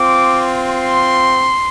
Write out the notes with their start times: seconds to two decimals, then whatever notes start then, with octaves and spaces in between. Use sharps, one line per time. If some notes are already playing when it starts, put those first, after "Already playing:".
Already playing: C4 F4 D6
0.71 C6